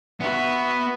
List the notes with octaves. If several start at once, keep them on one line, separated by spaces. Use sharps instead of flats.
B3 F#4 E5